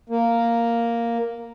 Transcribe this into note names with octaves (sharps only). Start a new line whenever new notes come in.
A#3